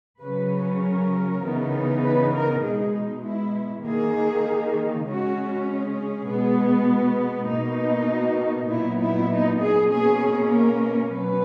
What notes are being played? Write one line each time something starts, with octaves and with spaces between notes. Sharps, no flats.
C#3 F#3 C#4 B4
A#4
C#3 E3 B3 D#4
B4
A#4
B2 G#3 D#4 G#4
D#4
E4
D#3 A#3 D#4 G#4
C#3 G#3 C#4 F#4
G#4
B2 G#3 B3
B2 A#3 D#4
F#4
A#2 F#3 B3 D#4 E4
E4
D#4
G#4
B2 A#3 C#4 G#4
A#4
B2 F#3 C#4 B4